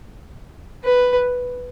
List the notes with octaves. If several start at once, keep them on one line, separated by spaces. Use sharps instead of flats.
B4